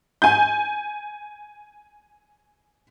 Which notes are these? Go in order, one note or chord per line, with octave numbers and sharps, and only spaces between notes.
G#5 G6